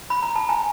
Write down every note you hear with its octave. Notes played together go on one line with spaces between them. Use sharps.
B5
A#5
A5
G#5 A#5